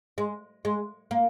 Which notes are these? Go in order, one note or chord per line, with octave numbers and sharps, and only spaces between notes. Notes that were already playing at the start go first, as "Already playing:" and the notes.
G#3
G#3
A#3